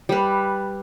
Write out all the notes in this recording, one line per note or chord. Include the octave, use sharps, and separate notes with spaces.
G3 B4